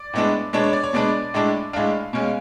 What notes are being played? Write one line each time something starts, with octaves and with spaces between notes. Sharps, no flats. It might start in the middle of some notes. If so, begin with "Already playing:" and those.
Already playing: D5
A2 G#3 B3 D4
B2 G#3 B3 D4 C#5
C#5
D5
C#5
B2 G#3 B3 D4 D5
A2 G#3 D4
A2 G#3 D4 F5
B2 G#3 C#4